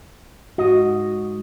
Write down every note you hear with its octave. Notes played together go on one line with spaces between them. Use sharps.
G#2 F#4 D#5